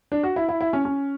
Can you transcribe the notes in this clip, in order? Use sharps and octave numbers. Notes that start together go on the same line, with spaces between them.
D4
F#4
E4
E4
E4
C#4
C#4